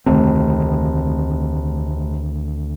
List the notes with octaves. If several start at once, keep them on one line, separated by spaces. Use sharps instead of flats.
F1 D2 D#3 C4